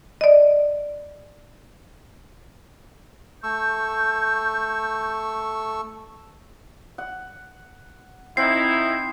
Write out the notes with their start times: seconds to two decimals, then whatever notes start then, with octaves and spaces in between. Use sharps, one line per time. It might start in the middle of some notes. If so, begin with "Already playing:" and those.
0.21 D5 D#5
3.43 A3 C#6 E6 G6
6.98 F#5
8.37 C4 D#4 E4 F#5 C7